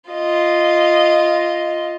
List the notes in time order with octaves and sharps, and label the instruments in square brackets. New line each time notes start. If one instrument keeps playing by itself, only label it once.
[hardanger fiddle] F4 D#5